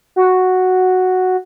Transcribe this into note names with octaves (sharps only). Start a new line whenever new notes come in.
F#4